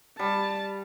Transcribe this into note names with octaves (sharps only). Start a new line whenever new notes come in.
G3 A5